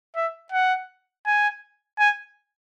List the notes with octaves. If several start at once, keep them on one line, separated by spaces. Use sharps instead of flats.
E5
F#5
G#5
G#5